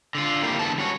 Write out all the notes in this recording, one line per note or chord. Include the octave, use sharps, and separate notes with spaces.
D3 F4
F2 A#3 E4 G4 F5
E2 D3 G#3 B3 A5
G3 C#4 F#4 C#5